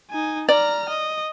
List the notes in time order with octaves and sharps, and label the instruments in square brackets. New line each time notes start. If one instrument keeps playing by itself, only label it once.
[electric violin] D#4 G#5
[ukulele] D5 [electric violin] A#5 F6
[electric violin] D#5